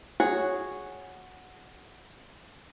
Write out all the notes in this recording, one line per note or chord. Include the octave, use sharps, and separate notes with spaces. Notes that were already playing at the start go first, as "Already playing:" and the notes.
F#4 G#4 C#5